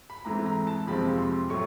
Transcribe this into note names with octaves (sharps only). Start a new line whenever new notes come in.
B5
G#2 E3 A3 C4 A#5
A#5
A5
F2 C3 F3 G#3 C4 B5
C6
A2 F#3 A3 C#6